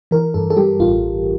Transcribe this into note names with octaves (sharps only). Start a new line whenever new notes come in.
E3 A#4
G2 A4
A4
G3 G4
A1 F4